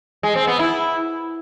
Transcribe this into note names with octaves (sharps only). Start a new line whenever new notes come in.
G#3
C4
B3
E4